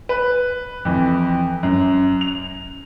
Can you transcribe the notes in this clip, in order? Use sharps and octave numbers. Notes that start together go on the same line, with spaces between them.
B4
F2 E3
F#2
F7